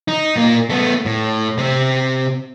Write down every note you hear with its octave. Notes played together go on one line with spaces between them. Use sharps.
D#4
A#2 A#3
A3 B3
A2
C3 C4